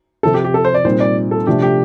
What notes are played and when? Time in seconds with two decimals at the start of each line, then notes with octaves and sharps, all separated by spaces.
0.23 C3 F3 C4 A4
0.34 G4
0.44 G4
0.54 A4
0.65 C5
0.74 D5
0.85 A#2 G3 C4 D#4 C5
1.00 D5
1.31 A4
1.47 C3 F3 A3 D4 G4
1.62 G4